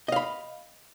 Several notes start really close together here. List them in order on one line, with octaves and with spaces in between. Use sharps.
D#5 F5 B5